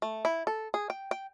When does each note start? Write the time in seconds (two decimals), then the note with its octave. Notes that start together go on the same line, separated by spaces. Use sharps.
0.02 A3
0.25 E4
0.47 A4
0.74 G#4
0.90 G5
1.11 G5